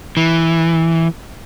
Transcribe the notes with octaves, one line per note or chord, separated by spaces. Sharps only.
E3